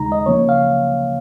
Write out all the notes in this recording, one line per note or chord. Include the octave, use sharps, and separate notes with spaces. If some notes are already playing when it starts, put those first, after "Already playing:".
Already playing: D#2 C#3 G#3 D#4 A#5
D#5
C#2 C#3 F3 A#3 C#5
F5